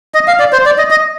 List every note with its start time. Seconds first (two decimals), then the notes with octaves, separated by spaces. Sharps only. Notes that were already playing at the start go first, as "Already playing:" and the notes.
0.14 D#5
0.28 F5
0.39 D5
0.53 C5
0.66 D5
0.78 D#5
0.90 D#5